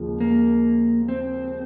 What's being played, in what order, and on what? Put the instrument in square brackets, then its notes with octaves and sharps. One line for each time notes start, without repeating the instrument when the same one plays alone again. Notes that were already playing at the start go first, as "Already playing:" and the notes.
Already playing: [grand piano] D#2 C#3 F3 G#3
[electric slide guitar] A#3
C4